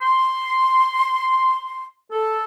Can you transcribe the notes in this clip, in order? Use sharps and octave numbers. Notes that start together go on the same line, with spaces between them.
C6
A4